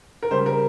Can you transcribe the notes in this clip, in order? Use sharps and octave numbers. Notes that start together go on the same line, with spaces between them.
A#4
C#3 G3 C5
A#4